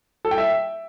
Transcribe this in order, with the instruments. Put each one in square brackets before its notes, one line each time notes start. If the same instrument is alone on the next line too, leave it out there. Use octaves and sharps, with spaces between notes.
[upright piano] A4
G5
E5